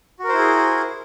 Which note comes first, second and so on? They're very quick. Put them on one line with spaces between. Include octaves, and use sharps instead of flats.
F#4 A#4 C5 E4 G#4